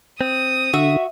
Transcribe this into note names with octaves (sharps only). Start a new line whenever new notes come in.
C4 D#6
D3 F#4 E5